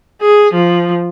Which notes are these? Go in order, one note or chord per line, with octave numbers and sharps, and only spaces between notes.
G#4
F3